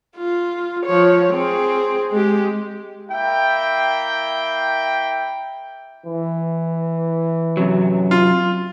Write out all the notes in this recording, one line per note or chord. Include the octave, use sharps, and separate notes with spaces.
F4
F3 C#5
C4 G#4
G#3 G4
A#3 E4 E5 G5
E3
F#2 C3 F#3
F4